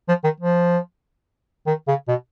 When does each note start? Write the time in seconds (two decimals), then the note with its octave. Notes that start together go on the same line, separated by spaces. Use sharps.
0.08 F3
0.24 D#3
0.40 F3
1.66 D#3
1.88 C#3
2.08 B2